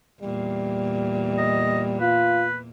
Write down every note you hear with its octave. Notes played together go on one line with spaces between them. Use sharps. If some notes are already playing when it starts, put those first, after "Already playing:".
E2 A#2 G3
D#5
F4 B4